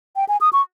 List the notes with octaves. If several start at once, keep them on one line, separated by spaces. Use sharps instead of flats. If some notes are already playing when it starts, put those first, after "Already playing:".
G5
G#5
D#6
C#6